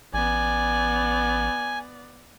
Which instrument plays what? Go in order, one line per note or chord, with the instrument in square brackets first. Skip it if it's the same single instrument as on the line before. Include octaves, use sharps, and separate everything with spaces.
[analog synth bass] A1 [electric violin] B3 D5 [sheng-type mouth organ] G#5